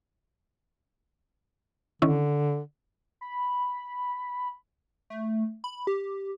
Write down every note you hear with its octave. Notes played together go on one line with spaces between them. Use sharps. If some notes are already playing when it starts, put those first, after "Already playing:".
D3 D#3 C#4 E4
B5
A3
B5
G4